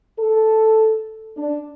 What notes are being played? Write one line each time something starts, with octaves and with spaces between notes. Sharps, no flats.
A4
D4